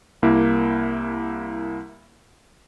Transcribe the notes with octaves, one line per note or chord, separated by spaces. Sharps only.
C2 A#3 E4